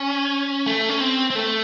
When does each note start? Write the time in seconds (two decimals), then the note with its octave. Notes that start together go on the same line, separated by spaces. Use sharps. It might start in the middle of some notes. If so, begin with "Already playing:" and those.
Already playing: C#4
0.66 A3
0.89 C#4
1.00 C4
1.30 C4
1.35 A3